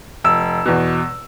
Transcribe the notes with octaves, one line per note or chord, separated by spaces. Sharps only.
F1 E6
E2 B2